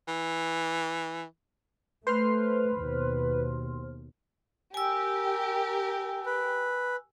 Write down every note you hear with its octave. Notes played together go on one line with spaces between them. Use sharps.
E3
A3 B4 C5 C6 F6
D#2 B2
G4 A#4 G#5 E6
B4